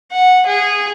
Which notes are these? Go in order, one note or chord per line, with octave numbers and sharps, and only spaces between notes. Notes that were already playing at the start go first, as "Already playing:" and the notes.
F#5
G#4